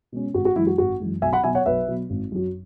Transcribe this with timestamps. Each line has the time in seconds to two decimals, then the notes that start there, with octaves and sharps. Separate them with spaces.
0.12 B2 G#3 C#4
0.34 G#1 F#4
0.45 F#4
0.56 F#2 E3 G#3 E4
0.67 F#4
0.78 G#1 F#4
1.00 F#2 E3 G#3
1.22 B1 E5 G#5
1.33 F#5 B5
1.44 B2 F#3 E5 G#5
1.55 C#5 F#5
1.66 B1 B4 E5
1.88 B2 F#3
2.10 G#1
2.32 F#2 F#3